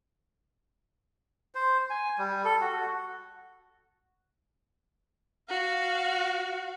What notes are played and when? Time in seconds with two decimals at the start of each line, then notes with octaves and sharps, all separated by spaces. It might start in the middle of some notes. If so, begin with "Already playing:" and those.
1.55 C5
1.90 G#5
2.18 G3
2.45 A4
2.61 F#4
5.49 F#4 F5